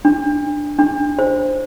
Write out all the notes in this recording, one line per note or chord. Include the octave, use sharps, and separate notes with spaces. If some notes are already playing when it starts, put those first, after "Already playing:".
D4
D4
C5